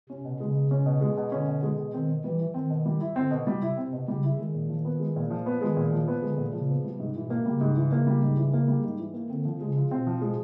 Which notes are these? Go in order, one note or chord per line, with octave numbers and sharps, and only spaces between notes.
C3 C#4
B2
C#3 G#3
B2
C#4
B2
G#3
B2
D3 C#4
B2
G#3
B2
D#3 C4
B2
E3 G3
E4
D#3 C4
B2
G3
E4
D3 C4
B2
C3 G3
E4
C3 C4
B2
C#3 G3
E4
D#3 G#3
A#2
F3
B3
G#3
A#2
F3
B3
D#3 G#3
A#2
F3
B3
D3 G#3
A#2
C#3 F3
B3
C3 G3
G#2
B2 E3
A#3
C#3 G3
G#2
E3
A#3
G3
G#2
E3
A#3
G3
G#2
E3
A#3
D3 C4
F3
C#3 G#3
F4
B2 C4
F3
G#3